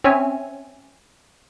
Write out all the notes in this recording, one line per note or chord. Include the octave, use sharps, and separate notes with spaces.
C4 C#4 C#5 E5 G#5